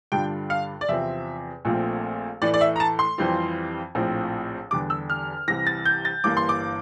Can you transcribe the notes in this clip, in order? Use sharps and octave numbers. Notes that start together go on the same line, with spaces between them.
G2 D3 G3 D4 F4 G5
F5
D5
E2 C3 F3 C4 E5
A#1 A#2 F3 A3 C4
A2 E3 A3 D5
D5
E5
A#5
A5
C6
F2 E3 G3 C4 F4
A#1 A2 F3 C4
E2 D3 G3 D4 D6
E6
F6
C2 C3 E3 A#6
A6
G6
A6
G1 G2 E3 A#3 D6
C6
D6